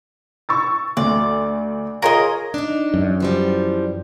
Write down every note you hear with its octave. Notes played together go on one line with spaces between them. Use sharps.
C#6 E6 A6
D2 D5
F4 G#4 A#4 C5 C#5 D#5
D4 D#4
F#2
E3 F3 G3